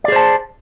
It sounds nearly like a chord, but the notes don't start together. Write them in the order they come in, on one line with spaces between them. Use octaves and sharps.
D5 G#4 C5 A5